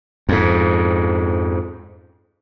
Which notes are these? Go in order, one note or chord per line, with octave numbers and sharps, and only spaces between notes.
F2 G#2